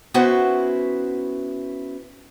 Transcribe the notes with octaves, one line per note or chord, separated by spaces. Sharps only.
B3 C#4 E4 F#4 B4 C5